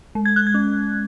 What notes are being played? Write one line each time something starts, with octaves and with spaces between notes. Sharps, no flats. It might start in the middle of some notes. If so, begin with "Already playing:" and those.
G#3
G#6
F#6
G#6
C#4